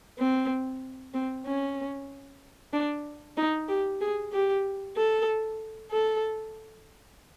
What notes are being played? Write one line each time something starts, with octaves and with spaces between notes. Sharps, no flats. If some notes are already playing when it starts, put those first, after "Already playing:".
C4
C4
C#4
D4
D#4
G4
G#4
G4
A4
A4